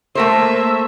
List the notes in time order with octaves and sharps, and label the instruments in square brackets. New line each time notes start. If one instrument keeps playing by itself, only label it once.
[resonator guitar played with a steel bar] A3 A#4 C5 [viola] A#3 E5